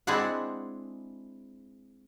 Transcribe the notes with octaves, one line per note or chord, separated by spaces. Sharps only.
G#3 C4 D4 E4 G#4 F#5